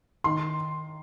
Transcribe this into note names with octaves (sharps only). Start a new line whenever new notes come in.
D#3 C6